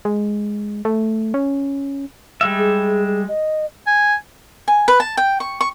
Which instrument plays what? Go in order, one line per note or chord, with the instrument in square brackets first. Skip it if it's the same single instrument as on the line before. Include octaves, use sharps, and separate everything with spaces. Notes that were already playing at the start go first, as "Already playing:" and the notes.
[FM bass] G#3
A3
C#4
[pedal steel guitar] G3 G#3 E5
[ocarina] G#4
G#4
D#5
[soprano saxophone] G#5
[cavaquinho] G#5
B4
A5
G5
C#6
C#6